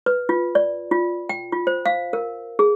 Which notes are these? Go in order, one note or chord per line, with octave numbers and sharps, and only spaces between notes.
B4
F4
D5
F4
G5
F4
C5
F5
A#4
G#4